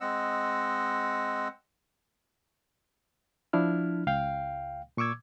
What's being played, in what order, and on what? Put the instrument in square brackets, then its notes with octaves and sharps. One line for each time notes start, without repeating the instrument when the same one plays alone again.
[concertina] G#3 C4 D#5 F#5 E6
[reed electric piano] F3 D4 E4 F6
C#2 F5 G5
A#2 C#6 D6 E6 G#6